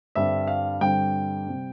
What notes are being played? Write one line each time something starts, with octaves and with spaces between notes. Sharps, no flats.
G2 D3 G3 C4 E5
F5
G2 D3 G3 C4 G5
C3 G3 C4